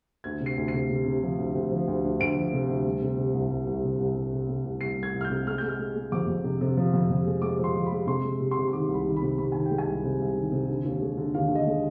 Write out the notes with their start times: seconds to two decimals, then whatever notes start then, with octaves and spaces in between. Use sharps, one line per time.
0.24 D2 G#6
0.40 C3
0.46 C7
0.58 D2
0.68 C3 C7
0.90 C3
1.06 C3
1.23 F3
1.38 D2
1.55 D2
1.71 F3
1.88 D2
2.04 D2
2.20 D2 D7
2.36 F3
2.53 C3
2.69 D2
2.85 G3
3.02 C3
3.18 C3
3.34 C2
3.51 C2
3.67 C2
3.83 C3
4.00 C2
4.16 G3
4.33 C3
4.49 C3
4.65 C2
4.81 C2 C7
4.98 G3 G#6
5.14 C2
5.21 F6
5.25 G6
5.30 C3
5.47 G#3 F6
5.58 G#3 G6
5.69 F6
5.79 G#3
5.96 G#3
6.12 F2 D6
6.28 F2
6.44 C3
6.61 C3
6.77 F3
6.93 F2
7.10 F2
7.26 G#3
7.42 G#3 D6
7.59 F3
7.64 C6
7.75 F3
7.86 G#3 B5
8.07 C3 C6
8.24 G#3
8.40 C3
8.51 C6
8.57 C3
8.68 C6
8.73 D#3 D6
8.89 C2
8.94 B5
9.05 D#3
9.16 B5
9.22 C3
9.38 C3 B5
9.52 D#3 G#5
9.66 G5
9.71 G#3
9.78 G#5
9.87 C2
10.04 C3
10.20 C2
10.36 D#3
10.52 C3
10.68 D3
10.84 D#2
11.01 G#3
11.18 D3
11.34 D#2 F5
11.50 D3
11.55 D#5
11.67 G#3